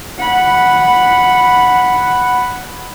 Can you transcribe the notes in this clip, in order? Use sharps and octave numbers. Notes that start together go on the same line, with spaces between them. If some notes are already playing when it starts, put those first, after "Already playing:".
F#5 B5